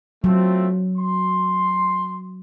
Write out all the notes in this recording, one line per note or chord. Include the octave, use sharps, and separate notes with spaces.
F#3 A3 C4 F4
C6